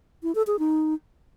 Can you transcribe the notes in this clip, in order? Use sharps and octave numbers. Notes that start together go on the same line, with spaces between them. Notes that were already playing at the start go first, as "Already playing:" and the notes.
E4
A4
G#4
D#4